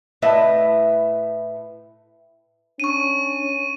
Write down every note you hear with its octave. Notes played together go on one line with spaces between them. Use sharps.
A2 A3 E4 B4 D#5 E5
C#4 D4 C#6 D#7